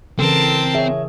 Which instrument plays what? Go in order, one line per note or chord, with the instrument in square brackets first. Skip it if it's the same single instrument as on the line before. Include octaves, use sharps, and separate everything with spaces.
[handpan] C#3 E3 [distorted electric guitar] C4 [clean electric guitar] A4 [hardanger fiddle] A#4 A5
[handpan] G#4 [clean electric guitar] C#5 E5